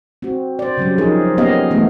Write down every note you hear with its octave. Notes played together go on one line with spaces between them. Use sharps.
C4 F#4
C5 D5
C#3 F#3 G3
F3 D#4 G#4 A#4
A#3 B3 C#4 G4 D#5 F5
E3 G#3 A3 B3